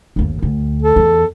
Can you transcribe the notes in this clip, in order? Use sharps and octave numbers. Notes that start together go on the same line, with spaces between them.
G1 D#2
D2
A4
E2